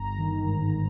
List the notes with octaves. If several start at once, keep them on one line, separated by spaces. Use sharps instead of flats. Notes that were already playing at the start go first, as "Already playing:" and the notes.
Already playing: G1 A#5
D#3
G#2